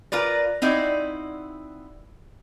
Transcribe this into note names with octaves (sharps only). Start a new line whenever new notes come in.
F4 A#4 B4 D5
C4 D#4 E4 F#4 D5